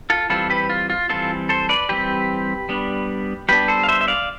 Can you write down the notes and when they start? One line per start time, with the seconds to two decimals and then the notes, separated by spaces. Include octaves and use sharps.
0.10 F4 A4
0.30 E3 G3 C4 F4 A4
0.50 G4 B4
0.70 F4
0.90 F4
1.09 E3 G3 C4 F4 A4
1.49 A4 C5
1.69 B4 D5
1.89 E3 G3 C4 G4 B4
2.69 G3 B3 D4
3.49 G3 B3 D4 G4 B4
3.68 A4 C5
3.83 F5
3.88 C5 E5
4.01 E5
4.08 D5 F5